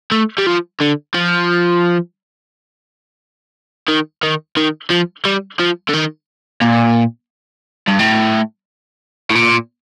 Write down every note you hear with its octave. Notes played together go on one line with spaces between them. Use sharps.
A3
G3
F3
D3
F3
D#3
D#3
D#3
F3
G3
F3
D3
D#3
A#2
G2
A2
A2
A#2